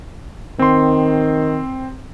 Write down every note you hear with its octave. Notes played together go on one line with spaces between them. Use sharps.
D#3 C4 C6